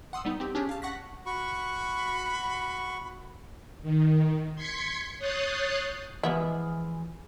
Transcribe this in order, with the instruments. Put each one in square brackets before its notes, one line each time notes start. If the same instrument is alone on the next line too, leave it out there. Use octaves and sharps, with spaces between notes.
[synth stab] F#5 C6 D#6 E6
G3 B3 D#4
C4 G4
C#4 D4 G4 G#4
F5 A5
F#5 C#6 F#6 A#6 B6
[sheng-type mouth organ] F#4 C#6 [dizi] B5
[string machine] D#3
C6 G#6 B6 C#7
C#5 D#6 F#6 G6 A6 C7
[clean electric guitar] E3 F3 G#4 [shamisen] G#3 B3 E4